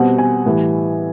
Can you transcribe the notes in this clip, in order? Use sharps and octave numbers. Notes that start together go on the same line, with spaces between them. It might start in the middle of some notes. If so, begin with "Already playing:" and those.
Already playing: B2 G3 C4 F#5
G#5
A2 E3 G3